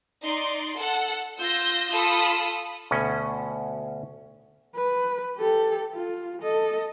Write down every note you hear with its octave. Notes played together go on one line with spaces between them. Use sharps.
D#4 D5 C6
A4 F#5
F4 E6 G6 A#6
F4 A4 B5 D#6 E6
D2 B2 C#4
B4
G4 A4
F4
A4 D#5